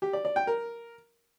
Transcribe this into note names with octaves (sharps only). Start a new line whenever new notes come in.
G4
D5
D5
G5
A#4